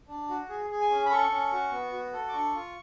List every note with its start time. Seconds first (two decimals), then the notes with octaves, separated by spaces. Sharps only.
0.08 D4
0.29 F#4
0.49 G#4
0.70 G#4
0.81 G#5
0.90 C#4
1.06 B5
1.11 A4 C#6
1.31 C#4
1.52 F#4
1.72 B3
1.92 F#4
2.13 A4
2.29 D6
2.33 D4 C#6
2.54 F4